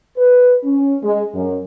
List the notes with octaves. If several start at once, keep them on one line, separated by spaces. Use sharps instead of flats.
B4
C#4
G#3
F#2